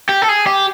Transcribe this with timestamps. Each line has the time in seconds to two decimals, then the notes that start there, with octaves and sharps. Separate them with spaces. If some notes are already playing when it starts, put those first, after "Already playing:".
0.09 G4
0.22 A4
0.29 G#4
0.47 G4